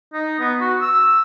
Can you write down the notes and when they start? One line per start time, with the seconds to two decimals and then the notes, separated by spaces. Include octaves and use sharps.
0.14 D#4
0.40 B3
0.61 F#4
0.81 E6